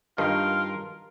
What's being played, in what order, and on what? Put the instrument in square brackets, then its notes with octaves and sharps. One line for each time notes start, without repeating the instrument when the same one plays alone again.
[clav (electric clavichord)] G2 D#3 D#4 [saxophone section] F4 A#4